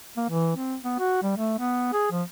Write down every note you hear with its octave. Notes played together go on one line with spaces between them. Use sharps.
A#3
E3
C4
B3
F#4
G3
A3
B3
G#4
F3